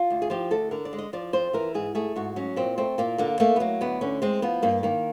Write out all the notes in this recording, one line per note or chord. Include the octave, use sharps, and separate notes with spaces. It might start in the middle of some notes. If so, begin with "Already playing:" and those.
Already playing: F4
D2
G#4
F3 G4
D2 A4
D3 A#4
D5
G#3
D#5
F3 D5
F2 C5
E3 A#4
G#2 G#4
A3 G#4
G#2 F#4
F#3 C#4
A#2 C4
A3 C4
A#2 A#3
D3 A#3
A3 A#3
B3
F#3 A#3
D2 B3
D3 C#4
G#3 C4
F3 B3
G2 A#3
D#3 A#3